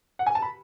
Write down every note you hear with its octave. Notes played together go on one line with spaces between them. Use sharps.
F#5
G#5
A5
B5